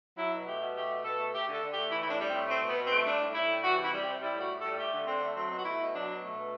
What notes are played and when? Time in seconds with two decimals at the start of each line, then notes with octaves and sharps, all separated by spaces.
0.17 F#3 E4
0.32 B2
0.47 A3 G4
0.60 B2
0.75 A3 G4
0.89 B2
1.04 B2 A4
1.18 A3
1.33 A3 G4
1.47 D3 A4
1.62 D3
1.71 A3 G4
1.90 E3 E4
2.01 E4
2.05 A2 D4
2.19 G3
2.29 A2 C4
2.47 A3 C4
2.63 B2 B3
2.77 B2
2.86 C4
2.92 A3
3.05 G3 D4
3.20 A2
3.34 A2 E4
3.48 G3
3.63 E3 F#4
3.77 C3
3.82 E4
3.91 G3
4.02 C3 C4
4.21 G3 E4
4.34 A2
4.40 F#4
4.50 A2
4.59 G3 A4
4.78 A3 G4
4.92 D3
5.07 D3 C4
5.22 A3
5.35 F#3 C4
5.50 B2
5.59 F#4
5.65 A3 E4
5.79 B2
5.94 F#3 D4
6.09 B2
6.22 A3
6.37 B2